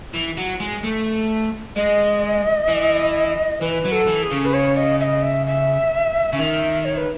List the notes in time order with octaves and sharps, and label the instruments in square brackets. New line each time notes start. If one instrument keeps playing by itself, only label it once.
[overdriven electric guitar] E3
F#3
G#3
A3
[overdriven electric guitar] G#3 [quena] D#5
[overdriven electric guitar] E3
[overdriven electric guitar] E3 [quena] B4
[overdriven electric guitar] F#3
[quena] A4
[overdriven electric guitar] E3
[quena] G#4
[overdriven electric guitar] C#3
[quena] B4
C#5
D#5
E5
D#5
E5
E5
[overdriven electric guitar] C#3
[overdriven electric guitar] D#3 [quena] E5
[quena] C#5
B4